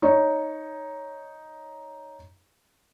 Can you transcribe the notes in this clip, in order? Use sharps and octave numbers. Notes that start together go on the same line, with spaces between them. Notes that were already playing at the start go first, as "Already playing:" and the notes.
D#4 C#5